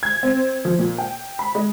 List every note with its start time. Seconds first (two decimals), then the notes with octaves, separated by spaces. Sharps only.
0.03 G#6
0.23 C4
0.65 F3
0.79 A#2
0.98 G5
1.39 B5
1.55 G#3